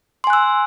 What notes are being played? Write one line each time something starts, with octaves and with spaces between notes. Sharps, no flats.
G#5 C6 E6 F#6